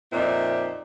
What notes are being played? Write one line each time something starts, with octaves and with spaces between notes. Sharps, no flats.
F2 A#2 C4 D#4 D5 E5